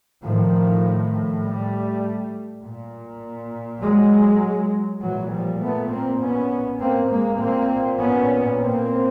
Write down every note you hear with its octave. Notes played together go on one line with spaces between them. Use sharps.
A2 D#3 F3
G3 A3
A#2
F#3 G#3
A#2 E3 F#3
F3 G3
A3 B3
A#3 C4
B3 C#4
A#3 C4
G#3 A#3
A#2 A#3 C4
B3 C#4
A#3 C4